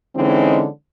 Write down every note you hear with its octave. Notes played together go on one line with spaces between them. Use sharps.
D3 E3 G#3 C4 C#4 D#4